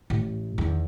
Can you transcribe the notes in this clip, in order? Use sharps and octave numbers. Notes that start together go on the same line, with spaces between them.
A1
E2 D#3